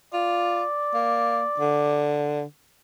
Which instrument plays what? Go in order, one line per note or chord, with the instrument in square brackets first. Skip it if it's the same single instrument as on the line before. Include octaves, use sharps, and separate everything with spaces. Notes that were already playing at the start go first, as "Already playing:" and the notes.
[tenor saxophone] F4 [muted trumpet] D5
[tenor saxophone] A#3
D3